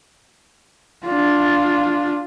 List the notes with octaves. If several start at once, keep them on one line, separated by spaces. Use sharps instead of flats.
D4 F4